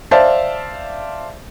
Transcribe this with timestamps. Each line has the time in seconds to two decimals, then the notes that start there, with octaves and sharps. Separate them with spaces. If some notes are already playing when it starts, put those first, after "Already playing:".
0.11 C5 D5 E5 F5 A5